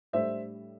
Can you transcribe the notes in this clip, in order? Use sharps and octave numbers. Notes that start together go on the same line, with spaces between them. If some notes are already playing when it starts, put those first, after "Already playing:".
A2 G3 D4 C5 E5